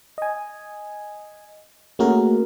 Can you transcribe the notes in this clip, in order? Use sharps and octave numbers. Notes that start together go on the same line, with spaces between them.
D#5 G#5
A3 A#3 C#4 F#4 G#4 A#4